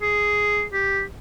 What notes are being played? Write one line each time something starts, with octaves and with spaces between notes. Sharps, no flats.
G#4
G4